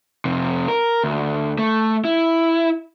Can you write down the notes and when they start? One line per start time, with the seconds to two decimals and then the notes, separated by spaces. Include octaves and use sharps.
0.25 F2 C3
0.68 A#4
1.04 D2
1.59 A3
2.05 E4